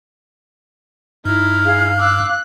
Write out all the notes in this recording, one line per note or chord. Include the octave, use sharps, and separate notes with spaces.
G2 D#4 E4 F6
G#4 F5
F5 D6 E6 F#6